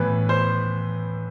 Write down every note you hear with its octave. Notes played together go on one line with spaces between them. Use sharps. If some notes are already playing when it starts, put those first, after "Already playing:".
Already playing: A2 E3 B3 B4
C5